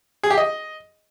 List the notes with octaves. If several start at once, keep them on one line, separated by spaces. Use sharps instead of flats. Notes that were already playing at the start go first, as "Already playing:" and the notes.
G#4
G4
D#5